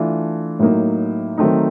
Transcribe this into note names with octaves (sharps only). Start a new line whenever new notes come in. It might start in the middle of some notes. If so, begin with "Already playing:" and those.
Already playing: E3 A3 D4 F4
A2 F#3 A#3 D#4
D#3 F#3 A3 C4 D#4